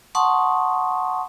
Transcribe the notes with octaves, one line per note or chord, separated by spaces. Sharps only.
F#5 A5 C6 C#6 D#6